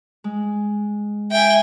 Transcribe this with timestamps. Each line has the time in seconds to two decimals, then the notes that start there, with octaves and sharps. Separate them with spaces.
0.24 G#3
1.31 E5 G5 G#5